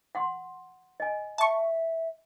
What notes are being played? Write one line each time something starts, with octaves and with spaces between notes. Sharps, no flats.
F#5 C6
D#5 G#5
E5 A5 C#6